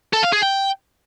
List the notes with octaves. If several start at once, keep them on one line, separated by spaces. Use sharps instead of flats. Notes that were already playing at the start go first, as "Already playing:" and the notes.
A4
F5
G#4
G5